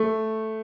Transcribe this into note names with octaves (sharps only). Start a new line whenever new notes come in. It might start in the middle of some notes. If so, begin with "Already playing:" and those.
Already playing: A3